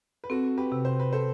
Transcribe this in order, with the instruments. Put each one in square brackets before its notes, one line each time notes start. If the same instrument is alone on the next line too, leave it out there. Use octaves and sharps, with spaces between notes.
[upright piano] B4
[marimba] C4 [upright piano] F#4 A4
[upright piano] G4 B4
[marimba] C3
[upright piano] C5
B4
A4 C5